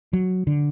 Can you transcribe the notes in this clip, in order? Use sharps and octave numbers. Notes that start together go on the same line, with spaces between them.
F#3
D3